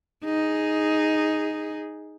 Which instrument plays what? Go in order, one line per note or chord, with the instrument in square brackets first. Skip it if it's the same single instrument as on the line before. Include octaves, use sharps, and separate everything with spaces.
[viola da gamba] D#4 G#4